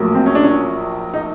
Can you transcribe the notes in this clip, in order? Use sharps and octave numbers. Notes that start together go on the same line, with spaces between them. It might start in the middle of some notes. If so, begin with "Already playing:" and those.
Already playing: A#1 A2 F#3 A#3
C4
C#4
D4
C#4
D#4